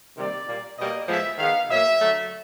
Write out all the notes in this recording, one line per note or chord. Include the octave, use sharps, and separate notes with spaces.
C3 D#3 G3 A#3 D5
A#2 G3 A#3
B2 G3 A#3 D#5
A2 F3 G#3 B3 E5
D#3 G#3 B3 F5
B2 F#3 A#3 E5
D3 F#3 A3